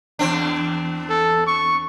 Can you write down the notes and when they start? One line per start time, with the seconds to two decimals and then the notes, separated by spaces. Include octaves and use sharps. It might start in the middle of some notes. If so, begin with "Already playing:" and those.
0.19 E2 C4 D4
1.09 A4
1.47 C#6